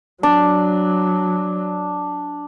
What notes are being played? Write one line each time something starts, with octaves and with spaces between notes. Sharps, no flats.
F#3 D4